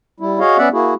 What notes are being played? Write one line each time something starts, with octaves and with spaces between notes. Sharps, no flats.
G3 E4
F#4 G#4 C#5 D#5 F5
B3 C#4 D5 E5 F#5
A#3 E4 F#4 G#4